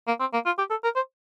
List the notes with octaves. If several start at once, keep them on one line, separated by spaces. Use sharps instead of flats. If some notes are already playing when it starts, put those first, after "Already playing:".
A#3
C4
A#3
F4
G4
A4
A#4
C5